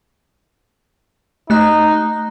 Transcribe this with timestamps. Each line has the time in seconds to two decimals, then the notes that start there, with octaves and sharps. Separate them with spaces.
1.50 A3 D#4 F#6